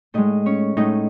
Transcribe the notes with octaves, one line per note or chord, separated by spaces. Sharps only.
A2 G#3 D#4 D#5
C#4 C#5
A2 G#3 D#4 D#5